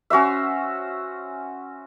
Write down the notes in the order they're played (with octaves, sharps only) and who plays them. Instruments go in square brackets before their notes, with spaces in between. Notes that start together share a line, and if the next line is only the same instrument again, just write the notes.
[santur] C#4 F#4 C5 E5